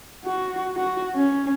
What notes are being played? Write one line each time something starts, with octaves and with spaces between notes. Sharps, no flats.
F#4
F#4
C#4